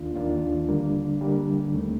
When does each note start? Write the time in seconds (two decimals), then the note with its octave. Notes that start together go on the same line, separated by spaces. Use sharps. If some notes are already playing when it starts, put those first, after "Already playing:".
Already playing: D#2 D#3 A#3 D4 F4
0.16 D#2 D#3 A#3 D4 F4
0.69 D3 G3 A#3 D4
1.21 D3 G3 A#3 D4
1.74 D#2 D#3 A3 C4